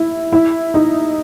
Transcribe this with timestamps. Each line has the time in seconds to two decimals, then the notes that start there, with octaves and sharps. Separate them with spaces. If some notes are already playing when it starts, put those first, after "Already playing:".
Already playing: E4
0.33 E4
0.74 D#4